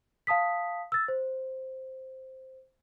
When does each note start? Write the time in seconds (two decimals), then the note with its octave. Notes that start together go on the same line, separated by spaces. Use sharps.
0.27 F5 A5 D#6 B6
0.92 E6 A6
1.08 C5